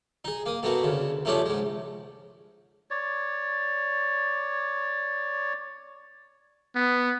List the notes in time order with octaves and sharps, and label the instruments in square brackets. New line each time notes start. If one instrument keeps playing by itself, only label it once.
[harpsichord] D#4 G#4
A#3 D#6
B2 A3 A#3 F#4
D2 C#3
C3 F3 A3 C#4 D4 D5
G#2 G#3
[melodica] C#5 D5
[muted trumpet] B3